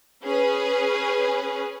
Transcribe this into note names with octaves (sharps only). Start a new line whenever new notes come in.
C#4 G#4 B4